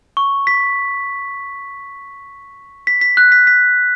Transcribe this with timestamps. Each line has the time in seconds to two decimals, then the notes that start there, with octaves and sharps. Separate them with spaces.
0.17 C#6
0.47 B6
2.87 B6
3.01 B6
3.17 F#6
3.32 B6
3.47 B6